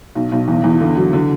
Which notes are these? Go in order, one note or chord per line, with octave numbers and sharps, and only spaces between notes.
B1
B1
E2
E2
D3
F#3
D3